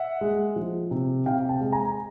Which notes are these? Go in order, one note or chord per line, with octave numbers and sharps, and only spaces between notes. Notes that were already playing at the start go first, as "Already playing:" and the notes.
Already playing: E5 F#5
G#3
F3
C3
C3 F5 G5
G5 A5
G#3
G#5 A#5